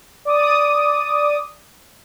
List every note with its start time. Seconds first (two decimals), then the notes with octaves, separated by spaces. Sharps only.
0.25 D5 D6 D#6